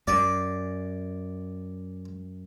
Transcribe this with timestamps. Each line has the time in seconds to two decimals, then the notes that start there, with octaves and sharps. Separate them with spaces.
0.08 F#2 D5